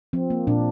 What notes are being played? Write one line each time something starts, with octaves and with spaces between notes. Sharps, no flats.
F3 C4
A#3
A#2 D4